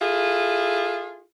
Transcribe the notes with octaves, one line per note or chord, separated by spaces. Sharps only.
E4 F4 G#4 A4